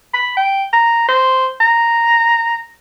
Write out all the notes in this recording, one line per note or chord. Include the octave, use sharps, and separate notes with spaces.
B5
G5
A#5
C5
A#5